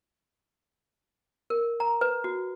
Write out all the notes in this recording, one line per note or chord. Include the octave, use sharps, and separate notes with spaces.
A#4
A#5
B4
F#4